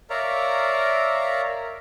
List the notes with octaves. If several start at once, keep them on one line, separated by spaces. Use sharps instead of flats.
A#4 C#5 D5 E5 F5 A#5